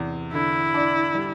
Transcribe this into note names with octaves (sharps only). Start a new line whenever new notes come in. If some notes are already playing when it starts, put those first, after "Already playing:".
Already playing: E2 C3
D3 E4
D4
G3